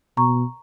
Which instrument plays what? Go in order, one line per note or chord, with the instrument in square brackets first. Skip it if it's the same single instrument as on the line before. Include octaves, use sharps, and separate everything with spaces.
[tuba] B2 [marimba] A#5 C#6